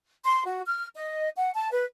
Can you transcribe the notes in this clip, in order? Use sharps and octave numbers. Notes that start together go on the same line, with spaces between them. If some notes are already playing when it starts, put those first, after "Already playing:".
C6
F#4
F6
D#5
F#5
A5
B4